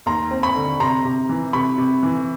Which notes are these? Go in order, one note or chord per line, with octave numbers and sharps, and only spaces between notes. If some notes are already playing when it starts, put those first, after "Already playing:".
D#2 A#5 C6
C4
B5 C#6
D3
C3 A#5 C6
C3
E3
C3 B5 C#6
C3
E3